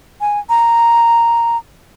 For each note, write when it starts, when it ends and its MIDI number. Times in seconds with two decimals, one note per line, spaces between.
0.21 0.39 80
0.49 1.57 82